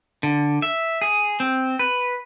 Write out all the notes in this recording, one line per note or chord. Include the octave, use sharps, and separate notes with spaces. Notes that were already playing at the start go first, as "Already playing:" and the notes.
D3
E5
G#4
C4
B4